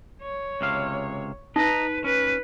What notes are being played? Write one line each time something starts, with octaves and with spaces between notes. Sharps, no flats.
C#5
C#2 C3 F5
D#4 B4 D#5 A#5
C#4 B4